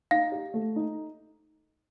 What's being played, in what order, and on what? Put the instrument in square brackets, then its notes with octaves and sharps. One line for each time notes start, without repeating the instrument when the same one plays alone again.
[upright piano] D#4 [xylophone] F5
[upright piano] G4
A3
D#4